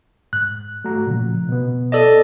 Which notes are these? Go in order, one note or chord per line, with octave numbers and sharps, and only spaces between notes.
G#2 F#6
A3 F#4 A#5
A#2 C#3 F3
B2 B3
A4 D5 D#5